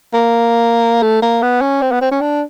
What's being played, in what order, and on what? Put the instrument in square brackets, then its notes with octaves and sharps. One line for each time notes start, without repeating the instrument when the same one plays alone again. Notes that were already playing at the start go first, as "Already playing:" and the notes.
[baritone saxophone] A#3
A3
A#3
B3
C#4
C4
B3
C4
C#4
D4